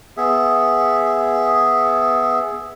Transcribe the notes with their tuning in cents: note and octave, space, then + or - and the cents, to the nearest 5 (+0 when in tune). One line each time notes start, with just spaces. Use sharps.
B3 +0 G#4 +0 E5 -5